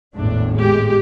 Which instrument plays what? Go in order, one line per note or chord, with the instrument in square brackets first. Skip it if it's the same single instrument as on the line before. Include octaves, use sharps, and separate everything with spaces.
[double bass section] G#1 E2 A2 [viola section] D4
[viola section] G#3 G4